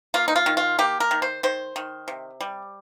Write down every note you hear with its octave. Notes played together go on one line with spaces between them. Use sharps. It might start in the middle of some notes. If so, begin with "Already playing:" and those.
A#3 F4
D#4
F4
D#3
F4
A#3 G4
A#4
D#3
C5
D#3 C5
D#3
C3
G3